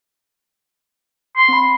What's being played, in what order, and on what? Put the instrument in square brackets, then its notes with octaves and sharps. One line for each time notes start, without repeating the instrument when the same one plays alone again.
[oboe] C6
[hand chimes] C4 B5